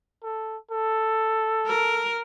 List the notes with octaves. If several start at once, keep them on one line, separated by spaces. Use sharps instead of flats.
A4
A4
A#4